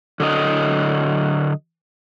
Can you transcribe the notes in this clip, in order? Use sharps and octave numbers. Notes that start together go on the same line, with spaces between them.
D3 F#3 D#5